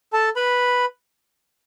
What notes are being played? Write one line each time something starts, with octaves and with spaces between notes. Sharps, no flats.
A4 A5
B4 B5